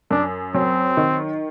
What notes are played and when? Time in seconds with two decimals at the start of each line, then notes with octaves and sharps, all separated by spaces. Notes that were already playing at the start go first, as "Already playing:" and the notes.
0.11 F#2 D4
0.54 F#3 C4
0.97 D#3